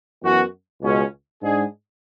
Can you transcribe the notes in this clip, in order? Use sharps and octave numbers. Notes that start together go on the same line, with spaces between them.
F#2 E3 B3 F#4
C#2 B2 G#3 C#4
G#2 G#3 D4 G#4